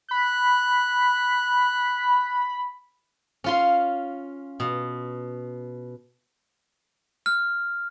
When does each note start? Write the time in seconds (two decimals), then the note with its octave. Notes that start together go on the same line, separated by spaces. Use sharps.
0.11 B5 F#6
3.44 C#4 F4 C6
4.60 B2
7.26 F6